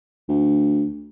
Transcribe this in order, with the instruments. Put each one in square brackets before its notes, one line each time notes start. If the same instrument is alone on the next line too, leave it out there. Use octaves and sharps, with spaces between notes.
[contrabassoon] D2